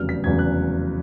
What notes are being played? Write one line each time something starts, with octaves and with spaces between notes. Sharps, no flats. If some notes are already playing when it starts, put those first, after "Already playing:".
Already playing: F1 E2 C#3 F#3 F6
B6
F1 E2 C#3 F#3 G#6
F#6